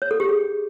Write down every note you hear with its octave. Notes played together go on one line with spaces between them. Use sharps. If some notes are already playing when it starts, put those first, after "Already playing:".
C#5
A4
G4
G#4